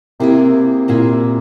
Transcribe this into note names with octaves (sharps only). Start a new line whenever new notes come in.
C3 A#3 E4 G#4
A#2 A#3 E4 G#4